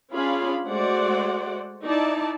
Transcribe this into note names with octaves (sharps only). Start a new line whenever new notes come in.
C#4 D4 F4 G#4 F5 B5
G#3 A3 F#4 C5 D5 F#5
D#4 E4 D5 A5